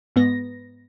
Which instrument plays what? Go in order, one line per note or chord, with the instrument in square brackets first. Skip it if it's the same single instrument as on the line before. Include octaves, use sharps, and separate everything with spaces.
[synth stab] G#2 B3 A#6